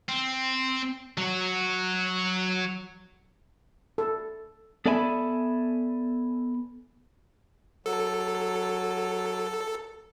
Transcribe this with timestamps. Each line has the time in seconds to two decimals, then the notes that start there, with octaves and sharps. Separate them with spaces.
0.09 C4
1.18 F#3 F#4
3.98 A4
4.86 B3 A4 D5 E5 G#5 B5
7.86 F#3 A4